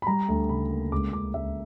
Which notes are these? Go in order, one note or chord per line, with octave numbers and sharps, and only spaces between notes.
B5
G3 A#5
D2
C#3 B5
A#3
C#2 D6
C#2 D6
C#2 E5